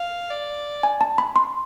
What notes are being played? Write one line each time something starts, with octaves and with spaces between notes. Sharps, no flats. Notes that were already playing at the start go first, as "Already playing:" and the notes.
Already playing: F5
D5
G#5
A5
B5
C6